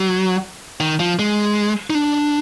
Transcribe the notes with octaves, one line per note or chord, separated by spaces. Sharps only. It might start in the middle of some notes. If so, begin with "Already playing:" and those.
Already playing: F#3
D#3
F3
G#3
D#4
D4